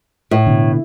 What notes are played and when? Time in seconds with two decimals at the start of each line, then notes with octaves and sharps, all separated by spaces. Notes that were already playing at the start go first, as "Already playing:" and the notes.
0.31 A2
0.47 B2 D3